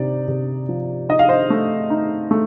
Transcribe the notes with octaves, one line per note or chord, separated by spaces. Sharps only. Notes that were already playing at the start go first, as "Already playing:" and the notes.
Already playing: C3 D#4 D5
C3
F3
D#4 D#5
F5
C5 D#5
A3
D#4
A3